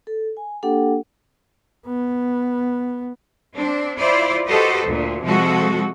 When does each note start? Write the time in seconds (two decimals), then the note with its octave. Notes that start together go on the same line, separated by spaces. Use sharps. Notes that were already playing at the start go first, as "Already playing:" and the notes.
0.07 A4
0.37 G#5
0.63 A#3 D4 G4 A4 F#5 G5
1.86 B3
3.54 C4 D4
3.97 E4 F4 C5 D5
4.47 F#4 G4 A4 B4 C5 D#5
4.86 D2 A#2
5.22 C3 F3 G#3 F#4 A4